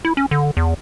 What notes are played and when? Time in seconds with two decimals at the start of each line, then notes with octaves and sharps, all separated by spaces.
0.05 E4
0.17 C#4
0.31 D3
0.57 E2